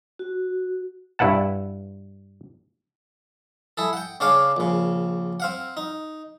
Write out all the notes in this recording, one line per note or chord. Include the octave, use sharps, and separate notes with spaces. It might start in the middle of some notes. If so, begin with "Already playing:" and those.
F#4
G2 E4 B4 F#5 A5
E4 G#4 A4
F#5 G5
C#3 D4 C#5 F5 D6
A#1 C#3
C4 F5 F#5
D#4